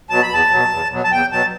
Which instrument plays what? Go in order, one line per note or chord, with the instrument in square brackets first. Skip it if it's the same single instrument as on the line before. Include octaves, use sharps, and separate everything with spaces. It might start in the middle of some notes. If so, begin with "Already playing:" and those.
[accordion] B2 F#3 A5
B5
E2 A5
B2 F#3
E2
B2 F#3
A5
E2 G5
B2 F#3 A5